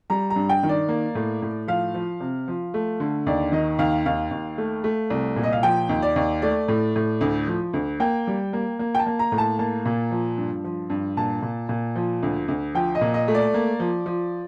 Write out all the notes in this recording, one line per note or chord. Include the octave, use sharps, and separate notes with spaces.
G3 A#5
A#5
G2
G5
D#3
D5
A#3
A2
A2
F3 F5
F3
C3
F3
A3
D3
D#2 D5
D#3 D#5
D#2 F5
D#2 F5
D#2
A3
A3
C2
A#2
D#5
F5
F3 G5
D#2
D5
D#2
A3 D5
A2
A2
D2
F3
D2
A#3 G5
G3
A#3
A#3
G5
A5
A#3
A#5
A2
A5
A#3 A5
A#2
F3
G2
F3
G2
A#2 A5
A#2
A#2
F3
D2
D2
F3 G5
D#5
A#2
D#5
A3
D5
A#3
F3
F3